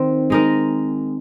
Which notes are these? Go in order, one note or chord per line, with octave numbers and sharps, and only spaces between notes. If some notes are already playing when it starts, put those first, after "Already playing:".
Already playing: D#3 C4
G#3 D#4 A#4